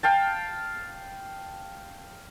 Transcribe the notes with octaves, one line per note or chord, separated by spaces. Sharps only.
F5 G5 A5